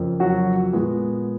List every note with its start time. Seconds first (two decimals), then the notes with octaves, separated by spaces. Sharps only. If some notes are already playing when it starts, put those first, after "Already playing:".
Already playing: F2 C#3 F3 A#3
0.20 F#3 F#4
0.73 A#2 G#3 B3